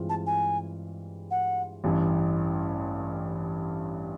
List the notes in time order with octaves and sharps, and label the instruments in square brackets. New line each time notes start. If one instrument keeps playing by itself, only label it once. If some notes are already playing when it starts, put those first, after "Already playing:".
Already playing: [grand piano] G2 E3 G#3 C4 F4
[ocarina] A5
G#5
F#5
[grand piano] A1 G2 E3